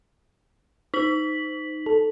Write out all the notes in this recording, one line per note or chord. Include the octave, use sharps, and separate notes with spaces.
D#4 B6 F#7
A4